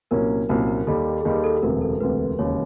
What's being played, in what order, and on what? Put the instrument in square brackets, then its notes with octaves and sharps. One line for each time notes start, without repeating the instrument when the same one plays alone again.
[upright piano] C2 A#2 F#3 A#3 C#4 [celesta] A#4
[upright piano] C2 A#2 F#3 A#3 C#4 [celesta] A#4
[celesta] A#4
[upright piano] D#2 D#3 G3 [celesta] A4
[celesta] G#4
[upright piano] D#2 D#3 G3 [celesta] G4
[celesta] A4
[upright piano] E1 D2 C3 [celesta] A#4
[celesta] A4
[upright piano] E1 D2 C3 [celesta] B4
[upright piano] E1 D#2 C#3 [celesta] C#5